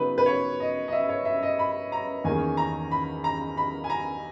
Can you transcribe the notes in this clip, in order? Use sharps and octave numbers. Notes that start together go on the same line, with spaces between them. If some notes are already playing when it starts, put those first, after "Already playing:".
Already playing: C#3 F#3 B3 D#4 B4
B4
C#5
D#5
D#5
E5
C#5
E5
D#5
B5
A#5
E2 D#3 A#3 C#4 G#5
A#5
B5
A#5
B5
G#5
A#5